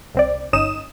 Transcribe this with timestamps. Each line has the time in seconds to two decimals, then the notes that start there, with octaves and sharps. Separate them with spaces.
0.15 C2 C4 D5
0.53 G1 C#4 D#4 D#6 E7